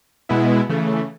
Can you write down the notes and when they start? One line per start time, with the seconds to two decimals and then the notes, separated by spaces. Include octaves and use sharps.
0.29 B2 G#3 B3 E4
0.69 C#3 E3 A3